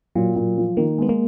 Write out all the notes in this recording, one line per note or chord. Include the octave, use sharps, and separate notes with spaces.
A#2 F#3
A#2
F3
D#3 A#3
G#3 B3
A#3